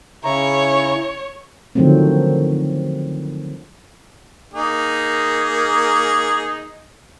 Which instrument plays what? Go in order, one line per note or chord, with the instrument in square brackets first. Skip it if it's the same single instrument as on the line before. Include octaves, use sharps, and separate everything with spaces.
[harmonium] C#3 E4 A#5 [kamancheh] C#5
[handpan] D3 D#3 F3 F#3 A3 C4
[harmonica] A#3 D#4 G#4